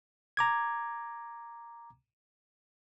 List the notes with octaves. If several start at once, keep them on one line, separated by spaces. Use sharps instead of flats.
A#5 D6 G#6